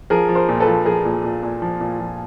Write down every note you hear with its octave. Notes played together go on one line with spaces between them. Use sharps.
F3 G#4 A#4
F3
A#4 C5
A#2
A4 B4
F3
F3 G#4 A#4
A#2
A#2
A#2
F3
A#2
F3